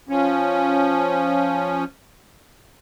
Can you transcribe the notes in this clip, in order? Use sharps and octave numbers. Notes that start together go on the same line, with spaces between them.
F3 C#4